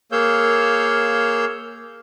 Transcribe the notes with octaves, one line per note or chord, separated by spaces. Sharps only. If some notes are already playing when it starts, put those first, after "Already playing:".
A#3 G#4 C#5 F5 E6 G6